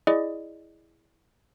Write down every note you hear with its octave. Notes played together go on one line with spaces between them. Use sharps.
E4 G#4 D5 D#5